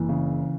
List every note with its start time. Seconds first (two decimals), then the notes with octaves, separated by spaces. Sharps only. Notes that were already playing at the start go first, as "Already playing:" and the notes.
Already playing: F#1 E3
0.09 C#3